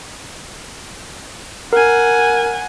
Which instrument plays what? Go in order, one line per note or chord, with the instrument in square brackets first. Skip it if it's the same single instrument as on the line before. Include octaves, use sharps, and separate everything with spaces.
[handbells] A#4 [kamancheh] F#5 G#5